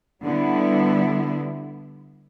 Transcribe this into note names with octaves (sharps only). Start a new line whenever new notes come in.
D3 G3 B3 E4